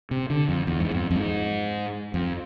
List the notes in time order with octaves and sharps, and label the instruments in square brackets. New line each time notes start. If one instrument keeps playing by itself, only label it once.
[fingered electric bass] C3
D3
F2
E2
G#2
F2
F2
G#2
F2